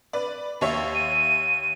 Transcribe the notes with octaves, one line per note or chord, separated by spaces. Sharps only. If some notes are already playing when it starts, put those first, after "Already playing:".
B4 D5
D#2 C#5 E5
D#7